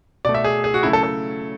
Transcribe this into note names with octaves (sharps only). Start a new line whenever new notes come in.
B2 A3 D5
E5
G#4
G#4
F#4
C#3 F#3 A3 E4
A4
A4